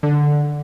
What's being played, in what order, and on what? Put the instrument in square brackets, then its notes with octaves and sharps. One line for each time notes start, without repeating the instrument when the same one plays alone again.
[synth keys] D3